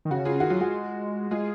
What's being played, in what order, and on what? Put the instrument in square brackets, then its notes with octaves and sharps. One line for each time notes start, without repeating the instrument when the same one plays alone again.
[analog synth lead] D#3
[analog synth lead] C#3 [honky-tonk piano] F#4
[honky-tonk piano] F4 G#4
[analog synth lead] D#3 [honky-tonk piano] F#4
[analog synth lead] F#3 [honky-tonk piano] F4
[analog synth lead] G#3 [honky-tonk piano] F#4
[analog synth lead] G#3 [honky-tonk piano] F4 G#4